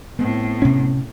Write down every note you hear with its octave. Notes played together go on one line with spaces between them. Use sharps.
A2 B3 C4
C3 C#4